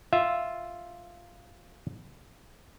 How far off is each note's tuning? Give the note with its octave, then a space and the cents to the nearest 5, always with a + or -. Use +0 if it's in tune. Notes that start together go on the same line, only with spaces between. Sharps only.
F4 +0 E5 +0